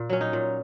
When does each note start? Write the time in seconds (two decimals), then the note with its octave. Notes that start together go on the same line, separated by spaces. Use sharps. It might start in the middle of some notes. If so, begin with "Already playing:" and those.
Already playing: A#2
0.10 F#3 C#4
0.21 D#4
0.33 A#2